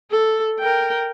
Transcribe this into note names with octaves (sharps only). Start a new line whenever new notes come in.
A4
A#4 G5